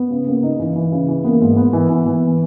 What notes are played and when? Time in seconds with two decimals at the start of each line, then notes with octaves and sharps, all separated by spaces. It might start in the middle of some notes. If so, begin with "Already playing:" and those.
Already playing: B3
0.10 C#3
0.27 C#3 A#3
0.43 D#4
0.59 E3
0.76 E3
0.92 C#3
1.08 E3
1.24 A#3 B3
1.41 G#2
1.57 B3
1.73 E3
1.89 E3 B3
2.06 E3